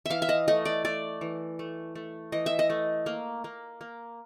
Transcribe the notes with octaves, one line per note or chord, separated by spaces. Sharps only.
E3 E5 F5
E5
D#5
A3 D#5
D5
A3 D5
E3
A3
A3
E3 D#5
E5
D#5
A3
A#3
A#3
A#3